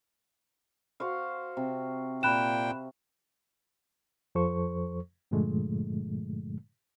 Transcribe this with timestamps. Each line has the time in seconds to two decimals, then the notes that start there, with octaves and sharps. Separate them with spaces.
1.00 F#4 C5 F5
1.57 C3
2.23 A#2 G5 B5 F#6 E7
4.35 F2 F3 A4 C5 C#6
5.31 G2 A#2 D3 F3 G#3 A3